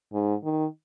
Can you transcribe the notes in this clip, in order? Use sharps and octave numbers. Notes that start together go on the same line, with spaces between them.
G#2
D#3